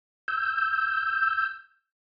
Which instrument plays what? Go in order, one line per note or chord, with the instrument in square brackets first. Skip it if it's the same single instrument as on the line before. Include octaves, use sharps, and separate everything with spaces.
[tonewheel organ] E6 G6